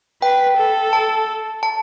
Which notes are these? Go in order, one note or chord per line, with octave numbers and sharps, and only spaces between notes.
B4 G5
A4
A5
A5